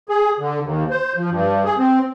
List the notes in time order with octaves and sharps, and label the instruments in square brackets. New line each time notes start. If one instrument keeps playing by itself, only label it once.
[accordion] G#4
D3
D#2
C5
F3
G2
G#4
C4